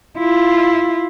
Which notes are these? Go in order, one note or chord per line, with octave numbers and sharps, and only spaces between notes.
E4 F4